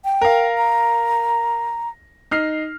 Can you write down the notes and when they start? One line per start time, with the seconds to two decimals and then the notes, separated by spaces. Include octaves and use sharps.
0.05 G5
0.22 A#4 F5
0.58 A#5
2.31 D#4 F6 C7